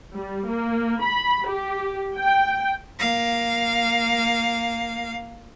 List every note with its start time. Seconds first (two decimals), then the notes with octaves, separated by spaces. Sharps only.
0.15 G3
0.47 A#3
1.01 B5
1.48 G4
2.17 G5
3.00 A#3 F5